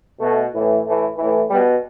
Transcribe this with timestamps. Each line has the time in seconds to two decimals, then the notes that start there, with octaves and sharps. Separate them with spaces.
0.20 B2 A3
0.53 A2 E3
0.85 A2 E3 A3
1.17 A2 E3
1.49 B2 G3